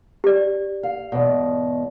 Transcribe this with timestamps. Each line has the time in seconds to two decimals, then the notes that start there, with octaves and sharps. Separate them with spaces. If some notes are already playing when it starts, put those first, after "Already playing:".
0.24 G4 D5
0.83 F5
1.12 E2 G#2 B2